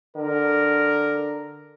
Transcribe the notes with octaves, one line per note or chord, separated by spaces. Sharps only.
D3 A#4